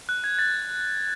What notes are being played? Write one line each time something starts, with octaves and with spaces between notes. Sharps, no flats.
F#6
G#6
A6